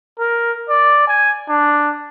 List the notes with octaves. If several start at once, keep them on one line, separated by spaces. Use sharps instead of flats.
A#4
D5
G#5
D4